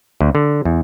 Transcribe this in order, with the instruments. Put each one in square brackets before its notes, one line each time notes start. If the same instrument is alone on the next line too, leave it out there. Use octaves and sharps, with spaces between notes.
[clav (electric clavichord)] D2
D3
E2